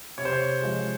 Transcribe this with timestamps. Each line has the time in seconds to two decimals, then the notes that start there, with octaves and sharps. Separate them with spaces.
0.18 C3 C#5
0.25 C5
0.33 C#5
0.62 F3 G#3